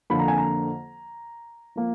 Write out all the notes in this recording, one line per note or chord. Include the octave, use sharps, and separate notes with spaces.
F2 D3 F3 A#3 B5
A#5
G#5
A#5
F3 A#3